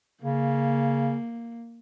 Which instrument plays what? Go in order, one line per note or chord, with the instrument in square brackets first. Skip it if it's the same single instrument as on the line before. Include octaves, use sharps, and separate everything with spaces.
[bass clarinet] C#3 [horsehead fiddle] A#3